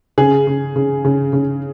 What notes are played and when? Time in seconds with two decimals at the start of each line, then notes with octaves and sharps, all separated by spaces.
0.18 C#3 G#4
0.47 C#3
0.76 C#3
1.05 C#3
1.33 C#3